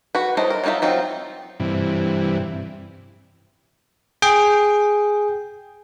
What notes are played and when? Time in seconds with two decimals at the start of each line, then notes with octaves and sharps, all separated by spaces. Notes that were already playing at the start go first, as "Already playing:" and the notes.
0.15 F#4 B4
0.37 F#3 E4 A4 C5 D#5
0.50 A#4
0.64 F#3 G#3 D#4 F4 E5
0.82 F#3 C4 D#4 F4
1.60 G2 C3 E3
4.22 G#4 G5